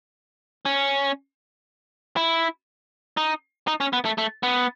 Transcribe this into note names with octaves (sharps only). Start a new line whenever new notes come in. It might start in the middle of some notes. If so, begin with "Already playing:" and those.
C#4
E4
D#4
D#4
C#4
B3
A3
A3
B3